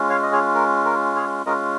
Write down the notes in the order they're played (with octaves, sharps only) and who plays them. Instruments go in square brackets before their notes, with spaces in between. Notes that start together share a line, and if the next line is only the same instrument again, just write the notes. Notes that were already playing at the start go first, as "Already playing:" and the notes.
Already playing: [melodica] G#3 C#4 F4
C#5 F5
D#5
G#4 C#5
A#4
A#4
G#4 C#5
G#3 C#4 F4 A#4 D#5